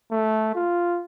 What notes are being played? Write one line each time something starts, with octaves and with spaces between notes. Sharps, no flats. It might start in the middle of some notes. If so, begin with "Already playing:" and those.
A3
F4